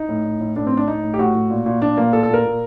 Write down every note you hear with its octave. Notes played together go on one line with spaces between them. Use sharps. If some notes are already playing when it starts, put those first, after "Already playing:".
Already playing: D#4
A2
A2
A2
A2 D4
C4
A2
D4
A2 D#4
A2
G4
A2 F#4
A2
A#2
A#2
A#2 D4
A#2 A#3
A#2 A4
A4
A#2 A#4
A#2